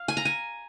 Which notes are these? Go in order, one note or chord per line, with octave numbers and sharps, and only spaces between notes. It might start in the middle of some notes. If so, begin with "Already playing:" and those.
Already playing: F5
G#5
A#5
G#5